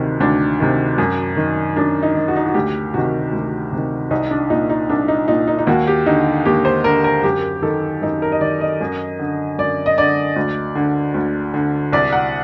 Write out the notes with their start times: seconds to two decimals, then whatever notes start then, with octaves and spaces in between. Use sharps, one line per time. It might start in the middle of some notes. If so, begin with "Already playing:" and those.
Already playing: D2 C3 D#3
0.20 D2 D4
0.60 C3 D#3
0.98 F#2
1.37 D#3
1.76 F#2 D4
2.03 D#4
2.15 D#3
2.28 F#4
2.36 D#4
2.46 F#4
2.54 D2 G4
2.94 C3 D#3 F#4
3.33 D2
3.72 C3 D#3
4.11 C2 D#4
4.31 D4
4.50 A#2 D#4
4.70 D#4
4.89 C2 D4
5.08 D#4
5.28 A#2 D#4
5.48 D#4
5.59 D#4
5.67 D#2 F#4
5.87 G4
6.06 D3 D#4
6.45 D#2 G4
6.65 C5
6.84 D3 A#4
7.04 A#4
7.24 F#2 G4
7.62 D#3 A4
8.02 F#2 D#4
8.22 A#4
8.32 D#5
8.41 D#3 D5
8.61 D#5
8.81 F#2
9.19 D3
9.58 F#2 D5
9.86 D#5
9.98 D3 D5
10.36 D2
10.75 D3
11.14 D2
11.54 D3
11.92 C2 D5
12.13 F#5